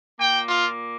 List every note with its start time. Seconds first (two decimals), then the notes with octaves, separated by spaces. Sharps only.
0.18 A#2 A#3 G5
0.48 F4